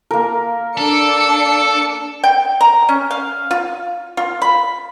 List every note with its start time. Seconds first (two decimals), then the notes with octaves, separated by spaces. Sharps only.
0.11 A#3 A#4
0.77 D4 A4 C#7
2.24 G5
2.61 A#5
2.89 C#4
3.10 F5
3.51 F4
4.17 F4
4.42 B5